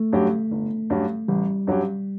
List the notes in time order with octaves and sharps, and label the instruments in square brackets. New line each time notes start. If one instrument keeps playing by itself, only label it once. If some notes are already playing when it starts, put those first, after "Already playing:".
Already playing: [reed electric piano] A3
[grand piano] G2 F#3 C#4 G4
G1
G2 F#3 C#4 G4
[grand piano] A1 [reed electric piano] G3
[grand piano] G2 F#3 C#4 G4